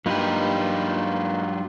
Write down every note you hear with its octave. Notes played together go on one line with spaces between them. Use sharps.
G2 F#3 A#3 D#4 F4 G4 B4